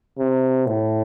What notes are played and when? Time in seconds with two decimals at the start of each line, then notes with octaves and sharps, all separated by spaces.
0.18 C3
0.67 A2